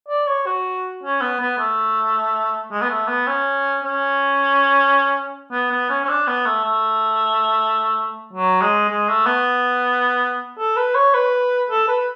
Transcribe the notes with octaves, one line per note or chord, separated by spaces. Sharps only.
D5
C#5
F#4
C#4
B3
B3
A3
G#3
B3
A3
B3
C#4
C#4
B3
B3
C#4
C#4
D4
B3
A3
A3
F#3
G#3
G#3
A3
B3
A4
B4
C#5
B4
A4
B4